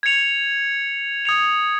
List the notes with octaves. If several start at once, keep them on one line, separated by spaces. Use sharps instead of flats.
G#6 C#7 F7
D#6 G#6 C#7 F7